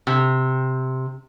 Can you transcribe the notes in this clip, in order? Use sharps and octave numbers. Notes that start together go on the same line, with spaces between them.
C3